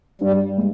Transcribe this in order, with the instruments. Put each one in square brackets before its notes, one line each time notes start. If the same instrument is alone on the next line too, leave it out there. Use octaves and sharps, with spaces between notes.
[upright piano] G2 [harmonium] G3
[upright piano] G#3